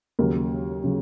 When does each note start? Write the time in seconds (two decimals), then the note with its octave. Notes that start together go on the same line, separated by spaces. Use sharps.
0.19 D#2 C#3 F#3 A#4
0.84 C#3 F#3